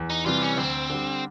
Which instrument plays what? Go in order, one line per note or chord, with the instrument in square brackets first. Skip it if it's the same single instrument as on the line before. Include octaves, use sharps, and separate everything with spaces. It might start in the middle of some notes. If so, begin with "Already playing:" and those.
Already playing: [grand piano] E2
[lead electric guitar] D#4
[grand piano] C3 E3 G3 [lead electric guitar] F4
[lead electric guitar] C#4
[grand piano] D2 [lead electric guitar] C4
[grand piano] D3 G3